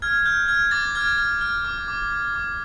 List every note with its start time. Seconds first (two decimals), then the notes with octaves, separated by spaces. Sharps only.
0.02 F6 G#6
0.26 F6 G6
0.48 F6 G#6
0.71 D6 A6
0.95 F6 G#6
1.18 F6
1.41 F6
1.65 D6
1.88 D6
2.10 D6
2.34 D6